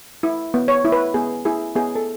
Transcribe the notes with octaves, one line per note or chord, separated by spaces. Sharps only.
E4
B3
C#5
E4
B4
B3 G#4
E4 G#4
B3 G#4
A4